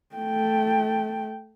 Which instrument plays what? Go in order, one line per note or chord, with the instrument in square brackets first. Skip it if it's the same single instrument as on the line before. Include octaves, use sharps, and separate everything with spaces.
[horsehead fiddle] A3 G5